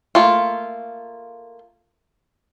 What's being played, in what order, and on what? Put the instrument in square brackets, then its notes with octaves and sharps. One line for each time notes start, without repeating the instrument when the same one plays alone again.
[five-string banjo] A3 A#3 F4